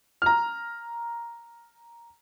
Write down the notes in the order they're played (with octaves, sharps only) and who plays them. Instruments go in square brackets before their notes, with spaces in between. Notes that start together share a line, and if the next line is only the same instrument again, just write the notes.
[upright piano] A#5 F6